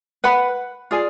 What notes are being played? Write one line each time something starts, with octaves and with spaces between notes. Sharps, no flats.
B4 F#5 B5
F4 G#4 D5 G#5